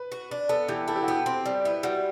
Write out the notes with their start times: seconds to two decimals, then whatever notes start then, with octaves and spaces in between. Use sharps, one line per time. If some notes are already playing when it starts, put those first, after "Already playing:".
Already playing: B4
0.12 F#4
0.31 D4
0.49 B3 A4
0.68 E3 G4
0.88 E4 A4
0.96 G4
1.03 F#4
1.08 B3 G4
1.26 C4
1.46 G3
1.65 B3 E4
1.83 G3 F#4